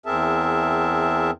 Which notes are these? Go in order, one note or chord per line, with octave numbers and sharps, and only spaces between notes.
E2 C4 G#4 A#4 E5 A5